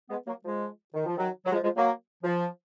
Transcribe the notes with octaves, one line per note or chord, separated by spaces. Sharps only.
G#3 B3
F#3 A#3
F3 G#3
D#3
F3
D#3 F#3
F#3
F3 G#3
F3 G#3
F#3 A#3
F3